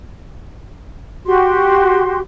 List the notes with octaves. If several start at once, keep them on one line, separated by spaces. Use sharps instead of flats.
F#4 G4 C6